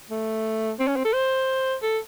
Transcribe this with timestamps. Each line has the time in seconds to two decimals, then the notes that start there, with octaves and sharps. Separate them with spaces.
0.10 A3
0.80 C4
0.88 C#4
0.96 C4
1.05 A4
1.13 C5
1.83 A4